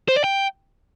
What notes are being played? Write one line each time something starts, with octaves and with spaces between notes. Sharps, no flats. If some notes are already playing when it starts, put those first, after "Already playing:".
C5
D5
G5